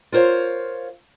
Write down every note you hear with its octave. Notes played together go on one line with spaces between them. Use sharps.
F4 A#4 C5 C#5 F5